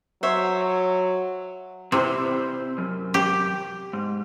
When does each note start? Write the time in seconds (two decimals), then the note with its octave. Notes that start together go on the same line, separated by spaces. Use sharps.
0.23 F#3 C5 C#5 E5
1.92 C3 C4 E4 C5
2.78 F#2
3.14 G4
3.93 G#2